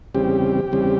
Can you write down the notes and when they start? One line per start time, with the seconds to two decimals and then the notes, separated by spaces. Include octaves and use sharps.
0.14 E2 C#3 G3 C4 G4
0.72 E2 C#3 G3 C4